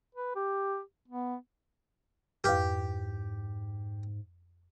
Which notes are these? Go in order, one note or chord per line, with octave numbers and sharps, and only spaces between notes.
B4
G4
B3
F2 G#2 G4 B4 F6